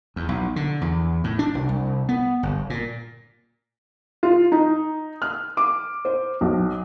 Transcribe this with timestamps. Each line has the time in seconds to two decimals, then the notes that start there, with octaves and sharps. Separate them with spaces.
0.16 E2
0.29 B1
0.56 D3
0.81 E2
1.24 A2
1.39 D4
1.55 C2
1.69 C2
2.09 B3
2.43 G1
2.70 A#2
4.23 F4
4.52 D#4
5.22 F6
5.57 D6
6.05 C5
6.41 B1